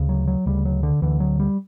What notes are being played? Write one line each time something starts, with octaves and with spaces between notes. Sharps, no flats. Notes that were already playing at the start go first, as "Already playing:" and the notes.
Already playing: D2 C#3
F#3
F#3
D2 C#3 G3
F#3
D3
D2 D3 E3
F#3
G3